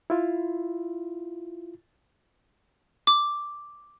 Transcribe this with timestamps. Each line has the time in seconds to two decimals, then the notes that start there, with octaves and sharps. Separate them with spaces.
0.10 E4 F4
3.07 D6